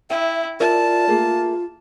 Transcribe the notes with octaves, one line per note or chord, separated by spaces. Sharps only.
E4 E5 G5
F4 A#4 D5 E5 A5
A3 A#3 G#4